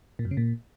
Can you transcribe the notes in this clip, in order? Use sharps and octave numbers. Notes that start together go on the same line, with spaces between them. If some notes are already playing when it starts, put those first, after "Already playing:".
A#2
F#2
C#3
A#2